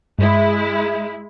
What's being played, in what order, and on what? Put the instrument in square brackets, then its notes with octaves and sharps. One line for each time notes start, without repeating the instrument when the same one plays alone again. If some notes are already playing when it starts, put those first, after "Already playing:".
[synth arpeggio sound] G2 [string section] G#3 E4